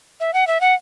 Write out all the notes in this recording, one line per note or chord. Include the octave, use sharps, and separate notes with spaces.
E5
F#5
E5
F#5